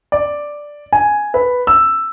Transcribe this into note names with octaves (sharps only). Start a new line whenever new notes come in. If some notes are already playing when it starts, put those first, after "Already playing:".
D5
G#5
B4
E6